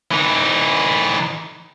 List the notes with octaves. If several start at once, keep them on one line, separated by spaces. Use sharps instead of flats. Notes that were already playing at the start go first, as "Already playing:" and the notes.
E3 D#4